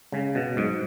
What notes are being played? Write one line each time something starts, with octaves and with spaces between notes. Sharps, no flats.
C#3 G#3
B2
G#2 F#3